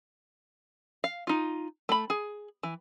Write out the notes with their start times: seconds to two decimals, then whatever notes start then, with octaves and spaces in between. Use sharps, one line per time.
1.04 F5
1.27 D#4 F4
1.89 A3 B5
2.10 G#4
2.63 E3